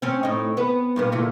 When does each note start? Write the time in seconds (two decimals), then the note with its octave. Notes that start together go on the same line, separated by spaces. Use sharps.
0.02 C4 C#4
0.23 A2 D#4
0.57 B3 B4
0.96 G2 A#2 B3
1.12 E2 A#2 D3